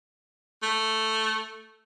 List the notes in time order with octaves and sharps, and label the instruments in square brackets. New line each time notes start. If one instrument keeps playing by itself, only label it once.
[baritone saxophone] A3